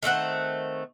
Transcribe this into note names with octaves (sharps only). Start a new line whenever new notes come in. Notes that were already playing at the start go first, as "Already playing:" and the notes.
D#3 A3 C4 F#5